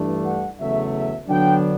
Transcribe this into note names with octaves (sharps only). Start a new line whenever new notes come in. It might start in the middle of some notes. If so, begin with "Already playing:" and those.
Already playing: G2 E3 A3 D4
F#5
E2 C#3 F#3 A3 E5
E5
D3 F#3 B3 D4 G5